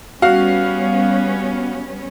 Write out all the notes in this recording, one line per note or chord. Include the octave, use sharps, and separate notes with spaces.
G3 B3 C#4 F#4 F5